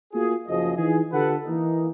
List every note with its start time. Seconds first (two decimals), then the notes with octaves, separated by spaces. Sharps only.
0.13 A#3 F4 F#4 G#4
0.47 F#1 F3 F#3 G#4 D#5
0.77 E3 D#4 F4 G#4
1.12 D3 F4 G4 A4 B4 F#5
1.45 E3 A#3 D#4